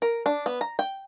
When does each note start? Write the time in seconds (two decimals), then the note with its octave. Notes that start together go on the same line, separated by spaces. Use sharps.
0.02 A#4
0.26 D4
0.46 B3
0.61 A#5
0.79 G5